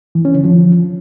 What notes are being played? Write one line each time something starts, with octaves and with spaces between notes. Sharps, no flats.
E3
C#4
D3
F3